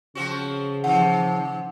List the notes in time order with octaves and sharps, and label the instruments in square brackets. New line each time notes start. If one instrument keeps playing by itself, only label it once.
[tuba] C#3 [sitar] F3 C4 F#4
[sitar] C3 D#3 [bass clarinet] F3 [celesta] F#5